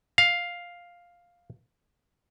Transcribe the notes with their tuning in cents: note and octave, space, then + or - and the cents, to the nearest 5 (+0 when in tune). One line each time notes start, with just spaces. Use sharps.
F5 +5